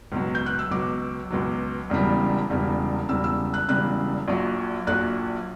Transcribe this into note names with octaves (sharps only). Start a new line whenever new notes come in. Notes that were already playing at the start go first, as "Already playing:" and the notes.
C#2 B2 F#3
G6
F#6
E6
C#2 B2 F#3 D6
C#2 B2 F#3
E1 E2 C#3 G3
E1 E2 C#3 G3
E1 E2 C#3 G3 E6
E6
F#6
E1 E2 C#3 G3 F#6
A#1 A#2 F#3
A#1 A#2 F#3 F#6